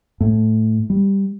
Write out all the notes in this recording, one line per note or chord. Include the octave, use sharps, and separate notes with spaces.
A2
G3